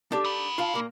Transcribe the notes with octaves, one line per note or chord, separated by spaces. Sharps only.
D4 G4 A4
D#4 B5
F4 F5 A5
A#2 A#3